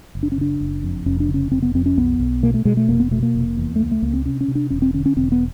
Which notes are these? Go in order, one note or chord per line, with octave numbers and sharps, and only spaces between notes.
F#1
D4
C#4
C#3 D4
F#1
F2
F1 C#4
D4
C#3
C#4
F1 C4
B3
F2 C4
C#4
B1 B3
B1
B2 A#3
A3
B2 G#3
A3
F1 A#3
B3
B2 A3
A#3
F1
E2
A3
C#2 A#3
A3
C#2 A#3
C4
C3 C#4
C#4
C3
D4
E1 C#4
C4
D3 C#4
C#4
E1 C4
B3